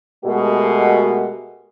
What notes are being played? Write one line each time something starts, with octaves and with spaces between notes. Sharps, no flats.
B2 G#3 A3 F#4 G4 A#4